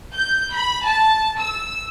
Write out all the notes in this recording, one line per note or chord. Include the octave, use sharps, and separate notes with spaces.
G6
B5
A5
E6